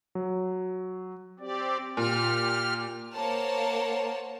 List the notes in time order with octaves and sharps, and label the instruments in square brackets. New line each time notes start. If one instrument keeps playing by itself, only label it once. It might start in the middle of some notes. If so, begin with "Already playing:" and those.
[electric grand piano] F#3
[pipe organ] C4 G4 D5
[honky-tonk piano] A#2 [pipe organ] G4 F6
[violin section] A#3 C5 C#5 F#5 A5